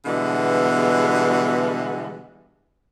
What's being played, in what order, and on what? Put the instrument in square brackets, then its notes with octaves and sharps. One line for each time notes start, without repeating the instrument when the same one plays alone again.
[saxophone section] B2 D3 E3 G3 G#3 B3